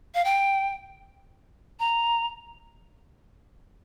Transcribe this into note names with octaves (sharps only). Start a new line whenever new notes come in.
F5
G5
A#5